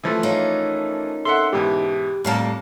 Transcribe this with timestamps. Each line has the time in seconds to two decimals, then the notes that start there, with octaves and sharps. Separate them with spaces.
0.04 E3 F3 A3
0.23 A#3 C#4 D#4
1.25 A4 E5 F#5 C6
1.53 G#2 B2 E3 G4
2.25 F2 A2 G3 A#3 F5 A5